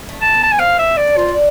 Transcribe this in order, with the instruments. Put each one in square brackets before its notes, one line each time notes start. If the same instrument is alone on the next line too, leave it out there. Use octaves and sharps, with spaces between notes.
[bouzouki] A3
[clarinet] A5
[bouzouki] B3
[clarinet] A5
G#5
[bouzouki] C4 [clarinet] F5
[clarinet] E5
D5
[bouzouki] D4
[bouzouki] C4 [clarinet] F4
[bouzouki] D4